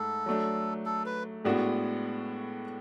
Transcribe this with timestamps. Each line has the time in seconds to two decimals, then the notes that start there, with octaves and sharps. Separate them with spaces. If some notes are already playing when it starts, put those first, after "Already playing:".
Already playing: G#2 A3 A4
0.26 F#3 A3 D4
0.86 A4
1.06 B4
1.44 A2 G#3 B3 D4 F#4